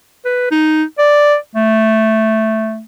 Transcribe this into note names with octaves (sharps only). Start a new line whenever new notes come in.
B4
D#4
D5
A3